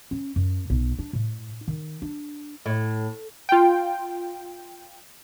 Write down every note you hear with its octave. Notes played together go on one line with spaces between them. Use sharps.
C#4
F#2
B1
D4
A2
D#3
D4
A2
F4 G5